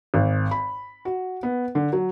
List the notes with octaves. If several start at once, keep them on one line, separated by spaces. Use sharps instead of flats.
G#1
B5
F#4
B3
D3
F#3